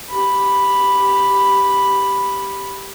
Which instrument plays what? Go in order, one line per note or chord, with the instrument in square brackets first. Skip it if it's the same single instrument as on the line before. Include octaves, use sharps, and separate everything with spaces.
[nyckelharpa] G4 B5